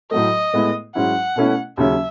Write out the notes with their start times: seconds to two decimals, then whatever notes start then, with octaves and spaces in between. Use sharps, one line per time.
0.11 A2 F#3 A3 D#5
0.53 A2 G#3 B3 E4
0.95 G#2 F#3 C#4 E4 F#5
1.36 B2 A3 C#4 E4
1.77 D#2 C#3 F#3 C#4 E5